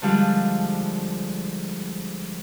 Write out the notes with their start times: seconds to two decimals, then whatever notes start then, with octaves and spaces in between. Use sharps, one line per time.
0.02 D3 F3 G3 G#3